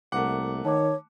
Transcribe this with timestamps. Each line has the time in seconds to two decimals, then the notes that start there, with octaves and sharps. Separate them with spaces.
0.12 C2 A3 A#3 F#5 D6
0.65 D#3 C#5 A5 D6